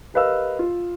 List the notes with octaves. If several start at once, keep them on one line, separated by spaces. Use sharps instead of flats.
G4 A#4 B4 D#5 F5 E6
F4